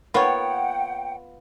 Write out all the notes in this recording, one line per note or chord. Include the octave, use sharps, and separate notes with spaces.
A#3 B3 F4 C#5 F#5 G5